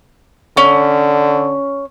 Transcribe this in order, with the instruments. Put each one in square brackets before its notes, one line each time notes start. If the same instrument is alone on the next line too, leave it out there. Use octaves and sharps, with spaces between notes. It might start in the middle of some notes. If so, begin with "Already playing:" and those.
[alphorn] D3 [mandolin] C#4